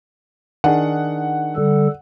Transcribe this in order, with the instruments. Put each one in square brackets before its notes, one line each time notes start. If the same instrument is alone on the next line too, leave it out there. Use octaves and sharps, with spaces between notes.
[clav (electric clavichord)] D#3 D4 G#4 [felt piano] F#5
[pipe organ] D3 G3 A4